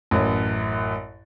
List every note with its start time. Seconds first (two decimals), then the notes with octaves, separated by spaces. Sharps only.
0.11 A1 F#2